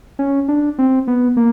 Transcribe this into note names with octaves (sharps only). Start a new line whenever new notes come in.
C#4
D4
C4
B3
A#3